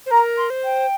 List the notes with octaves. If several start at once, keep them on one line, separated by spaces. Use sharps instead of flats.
C5
A#4 A#5
C6
C5
G5